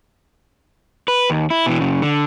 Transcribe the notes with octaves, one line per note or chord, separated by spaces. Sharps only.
B4
D#2
E4
B2 E3
F#2 C#3
D3